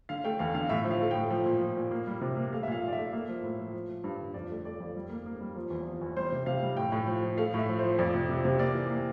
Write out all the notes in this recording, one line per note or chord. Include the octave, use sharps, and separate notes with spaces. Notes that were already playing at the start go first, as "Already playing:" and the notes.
D3 F5
A3 G5
E2 F5
D3 F5
A2 E5
F3
F5
A3
A2 G5
F3
A#2
F3
A#2
A#3
G3
C3
A#3
A3 F5
E5
A#2 F5
A#2
D5
E5
A3
A#3
F3
A2
F3
F3
F3
G2
D3
F2 D5
A3
A3 D5
F2
G3
A#3
A#3
G3
F3
E2
F3
E2
G3 C5
C3
C3 F5
G3
A2 G5
A2
F3
F3
A3 F5
A2
E5
F3
C5
F3
F2 D5
C3
C3
C3
A#3 D5
E3
A#3